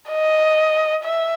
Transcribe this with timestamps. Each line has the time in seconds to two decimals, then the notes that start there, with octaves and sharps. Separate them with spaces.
0.10 D#5
1.04 E5